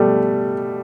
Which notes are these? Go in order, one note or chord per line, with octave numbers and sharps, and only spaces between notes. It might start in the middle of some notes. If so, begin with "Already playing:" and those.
Already playing: B2 G3 A3